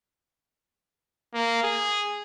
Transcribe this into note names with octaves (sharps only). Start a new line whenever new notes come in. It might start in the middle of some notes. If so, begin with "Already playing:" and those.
A#3
G#4